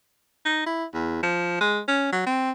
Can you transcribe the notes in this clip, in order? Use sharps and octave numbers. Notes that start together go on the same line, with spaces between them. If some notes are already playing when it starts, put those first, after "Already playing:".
D#4
E4
E2
F3
G#3
C#4
F#3
C4